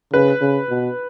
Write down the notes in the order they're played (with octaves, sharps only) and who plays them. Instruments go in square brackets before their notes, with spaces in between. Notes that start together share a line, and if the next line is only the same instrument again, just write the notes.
[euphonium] C#3 [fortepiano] B4
[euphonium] C#3
B2